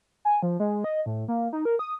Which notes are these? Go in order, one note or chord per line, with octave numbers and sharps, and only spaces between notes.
G#5
F3
G#3
D#5
A2
A#3
D#4
A#4
D#6